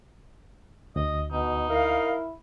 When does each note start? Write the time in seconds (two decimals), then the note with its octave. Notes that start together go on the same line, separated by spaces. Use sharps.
0.96 D2 D#5
1.31 B2 D#4
1.70 E4 A#4 F5